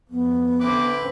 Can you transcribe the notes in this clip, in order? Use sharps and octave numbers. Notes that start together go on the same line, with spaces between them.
F2 B3
D3 C4 E4 B4 D6